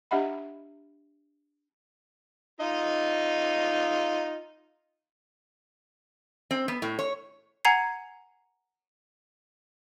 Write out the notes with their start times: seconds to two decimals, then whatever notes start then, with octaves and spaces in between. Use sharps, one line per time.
0.11 D4 G4 D#5 E5 F#5 B5
2.60 D#4 F4 D#5
6.51 C4
6.68 B3
6.82 A2
6.99 C#5
7.65 F#5 G#5 A#5 G#6 C7